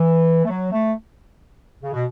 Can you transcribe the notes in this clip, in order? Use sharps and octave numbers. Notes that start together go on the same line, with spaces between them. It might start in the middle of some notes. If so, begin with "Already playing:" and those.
Already playing: E3
A3
F#3
A3
C#3
B2